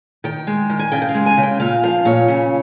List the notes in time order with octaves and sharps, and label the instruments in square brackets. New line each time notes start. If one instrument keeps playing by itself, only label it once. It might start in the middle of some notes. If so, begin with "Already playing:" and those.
[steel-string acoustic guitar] D#3 G5
G#3
D#3
G#5
C#3 G5
G5
F5
G#3
G#5
C#3
G5
A#2 F5
F3 F5
A#2 C#5
C#3